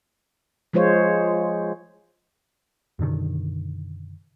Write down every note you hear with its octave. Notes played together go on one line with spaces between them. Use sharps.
F3 G#3 F4 C5 C#5
F#2 B2 D3 D#3